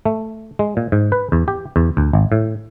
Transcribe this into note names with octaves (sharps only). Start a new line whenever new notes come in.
A3
G#3
A#2
G#2
B4
E2
G4
E2
D2
G#1
A2